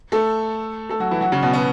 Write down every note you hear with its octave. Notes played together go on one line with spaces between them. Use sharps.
A3 A4
A3 A4
F#3 F#4
E3 E4
F#3 F#4
C#3 C#4
B2 B3
B2 B3